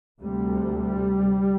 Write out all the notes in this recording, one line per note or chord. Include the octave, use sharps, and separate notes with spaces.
D2 C3 G3
G3